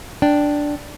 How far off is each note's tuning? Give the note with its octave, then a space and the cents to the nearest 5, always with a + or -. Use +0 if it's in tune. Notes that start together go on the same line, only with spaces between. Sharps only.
D4 +0 G5 +0